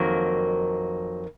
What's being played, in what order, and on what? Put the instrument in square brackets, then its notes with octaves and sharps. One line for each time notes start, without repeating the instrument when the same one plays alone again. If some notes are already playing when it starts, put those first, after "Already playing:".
Already playing: [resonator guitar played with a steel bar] F2 D#3 F#3 A#3